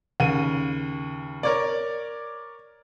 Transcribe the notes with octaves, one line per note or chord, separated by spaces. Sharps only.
D#2 C#3 D#7
A#4 C#5 D5